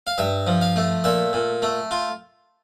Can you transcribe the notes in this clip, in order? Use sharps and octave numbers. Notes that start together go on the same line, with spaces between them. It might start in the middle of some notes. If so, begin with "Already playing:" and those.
F5
G2 E5
F3
F5
A3
A#2 E5
A#2
A3
F4